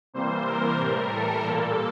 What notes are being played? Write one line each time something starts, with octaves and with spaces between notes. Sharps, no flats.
C3 E3 G3 A#3 C5
A#4
A2 E3 G3
A4
A#2 G3 A#3 A4